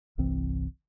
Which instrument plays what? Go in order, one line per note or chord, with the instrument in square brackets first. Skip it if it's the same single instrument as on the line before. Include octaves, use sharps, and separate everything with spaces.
[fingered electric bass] G1 C2 E3 C4